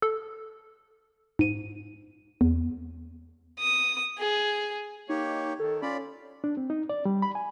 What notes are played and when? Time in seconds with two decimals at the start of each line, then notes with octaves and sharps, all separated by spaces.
0.02 A4
1.39 G#2 D#7
2.41 E2
3.59 D#6
4.18 G#4
5.09 A#3 D#4 G4 C#5
5.60 D#3 A4
5.82 C#4 F4 D5 B5
6.44 D4
6.57 C4
6.70 D#4
6.89 D5
7.05 G3
7.22 B5
7.35 G#5